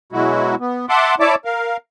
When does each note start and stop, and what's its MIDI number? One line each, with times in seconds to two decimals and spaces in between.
0.13 0.55 47
0.13 0.55 54
0.13 0.55 56
0.13 0.55 64
0.13 0.55 66
0.60 0.86 59
0.89 1.15 76
0.89 1.15 78
0.89 1.15 81
0.89 1.15 84
0.89 1.15 86
1.20 1.35 64
1.20 1.35 73
1.20 1.35 74
1.20 1.35 76
1.20 1.35 81
1.20 1.35 86
1.45 1.77 70
1.45 1.77 77